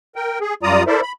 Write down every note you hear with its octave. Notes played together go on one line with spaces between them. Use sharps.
A#4 G5
G#4
F#2 G3 F4 D5 A#5 D#6
E4 A4 A#4 C5 D5 E5
B5